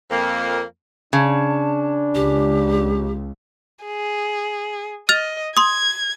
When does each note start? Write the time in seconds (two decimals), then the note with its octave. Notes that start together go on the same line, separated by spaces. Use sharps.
0.11 F2 A#3
1.13 C#3 D4 A5
2.15 C#2 G4
3.85 G#4
5.09 D#5 F6 A6 F7
5.57 C6 D#6 G#6